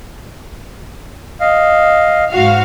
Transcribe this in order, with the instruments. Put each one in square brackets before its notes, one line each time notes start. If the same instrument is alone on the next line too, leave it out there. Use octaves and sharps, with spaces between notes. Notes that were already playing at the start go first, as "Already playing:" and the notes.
[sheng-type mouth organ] D#5 F5
[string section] G#2 F#4 F5